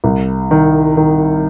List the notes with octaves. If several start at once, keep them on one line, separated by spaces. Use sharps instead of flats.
C2
D#3
D#3